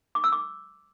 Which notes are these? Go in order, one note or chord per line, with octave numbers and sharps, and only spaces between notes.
D6
E6
D6